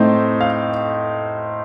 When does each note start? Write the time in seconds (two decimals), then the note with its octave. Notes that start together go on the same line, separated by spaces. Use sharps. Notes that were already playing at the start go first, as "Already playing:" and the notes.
Already playing: A2 A3 C4 D#4 C5
0.41 F5